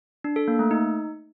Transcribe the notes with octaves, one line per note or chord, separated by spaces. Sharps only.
D4
A4
A#3
A3
D#4